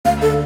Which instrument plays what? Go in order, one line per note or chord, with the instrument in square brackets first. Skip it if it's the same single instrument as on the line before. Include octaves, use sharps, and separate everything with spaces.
[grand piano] D2 [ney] F5
[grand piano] D3 [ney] A4